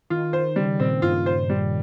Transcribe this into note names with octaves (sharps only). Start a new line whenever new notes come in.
D#3 F4
D#3 C5
C#3 G3
A#2 C4
G2 F4
C5
G3